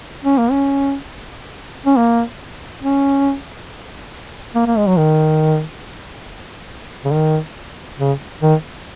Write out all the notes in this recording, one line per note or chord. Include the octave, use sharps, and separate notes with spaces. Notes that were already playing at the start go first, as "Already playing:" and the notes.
C#4
A#3
C#4
C#4
A#3
C#4
A#3
A#3
G#3
F#3
D#3
C#3
D#3
C#3
D#3